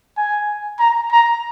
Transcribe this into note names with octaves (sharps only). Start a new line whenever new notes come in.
G#5
A#5
A#5